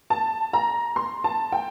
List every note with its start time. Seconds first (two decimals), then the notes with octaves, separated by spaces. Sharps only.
0.10 A5
0.53 A#5
0.96 C6
1.24 A5
1.52 G5